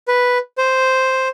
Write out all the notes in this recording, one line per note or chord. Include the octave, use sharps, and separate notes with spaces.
B4
C5